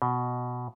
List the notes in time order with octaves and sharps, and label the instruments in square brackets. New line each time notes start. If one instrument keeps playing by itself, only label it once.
[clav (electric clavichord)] B2